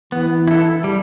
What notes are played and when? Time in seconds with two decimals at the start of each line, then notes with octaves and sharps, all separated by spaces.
0.12 E3 B3
0.48 E4 A4
0.84 G3